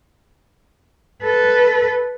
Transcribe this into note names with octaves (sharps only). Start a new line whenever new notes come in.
A4 B4